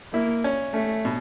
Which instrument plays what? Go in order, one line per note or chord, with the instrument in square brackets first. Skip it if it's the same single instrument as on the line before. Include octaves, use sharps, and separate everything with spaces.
[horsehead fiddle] A#3 [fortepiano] E4
[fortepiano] C#4
[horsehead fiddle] A3 [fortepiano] C#4
[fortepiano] B2